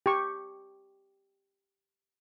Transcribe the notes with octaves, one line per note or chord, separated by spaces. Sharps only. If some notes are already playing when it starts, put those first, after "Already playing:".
G4 C#6